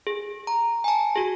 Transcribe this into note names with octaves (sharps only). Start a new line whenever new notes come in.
G#4
A#5
G#5 A5
F#4 G#4